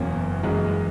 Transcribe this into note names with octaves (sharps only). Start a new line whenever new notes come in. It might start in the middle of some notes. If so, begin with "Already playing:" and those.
Already playing: F#1 E2 B2 A#3 C#4
F#2 E3 G#3